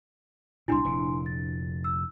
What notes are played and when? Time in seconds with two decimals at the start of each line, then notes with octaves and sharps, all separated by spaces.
0.68 C2 A#2 D4 E4 G#5 A#5 C6
0.85 F1 F2 A#2
1.26 A6
1.84 E6